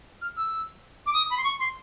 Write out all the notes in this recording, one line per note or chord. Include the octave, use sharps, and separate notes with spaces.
F6
E6
D6
D#6
B5
C6
C#6
C6